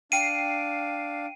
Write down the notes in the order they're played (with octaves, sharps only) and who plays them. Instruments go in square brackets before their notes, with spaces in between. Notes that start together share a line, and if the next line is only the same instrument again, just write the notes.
[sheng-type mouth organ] D4 F5 [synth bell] G5 C7 D7 [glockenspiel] D#7